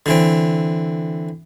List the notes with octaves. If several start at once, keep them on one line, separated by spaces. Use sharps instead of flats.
D3 E3 C4